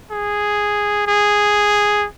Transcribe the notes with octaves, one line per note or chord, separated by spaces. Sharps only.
G#4
G#4